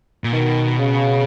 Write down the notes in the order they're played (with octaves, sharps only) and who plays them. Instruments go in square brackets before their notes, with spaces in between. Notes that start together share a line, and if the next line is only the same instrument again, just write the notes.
[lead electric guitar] A#2
[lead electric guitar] B2 [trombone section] D#3
[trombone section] C#3